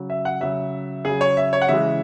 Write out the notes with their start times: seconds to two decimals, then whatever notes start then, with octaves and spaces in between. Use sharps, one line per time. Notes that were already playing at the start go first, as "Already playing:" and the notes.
Already playing: C#3 F#3
0.10 E5
0.25 F#5
0.41 C#3 F#3 E5
1.05 C#3 F#3 G#4
1.21 C#5
1.37 E5
1.53 C#5
1.62 F#5
1.68 C#3 E3 G#3 E5